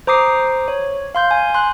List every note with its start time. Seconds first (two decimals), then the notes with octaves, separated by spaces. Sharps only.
0.07 C5 A#5 D6 D#6 C7
0.68 C#5
1.15 F5 C6 G6
1.31 G#5
1.54 C6 F#6